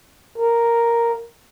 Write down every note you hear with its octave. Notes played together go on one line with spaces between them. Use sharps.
A#4